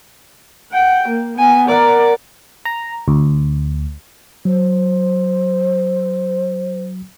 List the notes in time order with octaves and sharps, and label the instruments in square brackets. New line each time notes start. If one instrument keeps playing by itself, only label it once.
[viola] F#5 G5
A#3
B3 G#5
[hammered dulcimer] A#4 F#5 A#5 [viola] D5
[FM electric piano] A#5
D2
[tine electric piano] F#3 [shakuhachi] C5